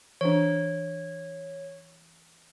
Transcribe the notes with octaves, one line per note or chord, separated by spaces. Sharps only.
E3 D4 C#5